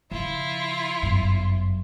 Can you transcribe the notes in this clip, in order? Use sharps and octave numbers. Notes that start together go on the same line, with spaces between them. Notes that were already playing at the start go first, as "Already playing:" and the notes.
C#3 F3 E4 F4
G1 F#2